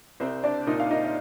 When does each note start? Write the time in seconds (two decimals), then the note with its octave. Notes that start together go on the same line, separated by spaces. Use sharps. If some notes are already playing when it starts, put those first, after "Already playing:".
0.20 C2 C4 C5
0.44 D4 D5
0.67 A#2 D#4 D#5
0.80 F5
0.91 D#4 D#5
1.04 D#5